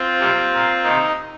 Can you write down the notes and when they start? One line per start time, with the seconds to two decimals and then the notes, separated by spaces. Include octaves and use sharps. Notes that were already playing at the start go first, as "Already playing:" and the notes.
Already playing: C4 F4
0.20 C3 G3 A#3
0.52 A#2 A#3
0.83 C3 D#3 A#3 D#4